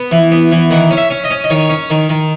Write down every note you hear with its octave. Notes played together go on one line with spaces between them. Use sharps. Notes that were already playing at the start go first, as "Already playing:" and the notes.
Already playing: B3
E3
B3
E3
D#3 F#5
C#4
E5
C#4
D#5
C#4
D#5
D#3 C#5
C#4
D#3
D#3